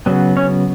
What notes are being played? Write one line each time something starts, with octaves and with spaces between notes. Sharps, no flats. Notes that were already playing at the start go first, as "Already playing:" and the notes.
C#3 F#3 B3
C#4 C#5